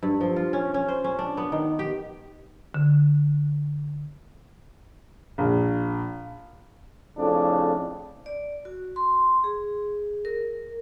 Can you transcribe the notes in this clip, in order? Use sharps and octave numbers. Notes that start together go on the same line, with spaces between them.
G2
F3
F4
C#4
C#4
C5
C#4
D4
B3
D#3
G4
D3
A#1
F2 A2 C#3 D4
D5
F#4
C6
G#4
A#4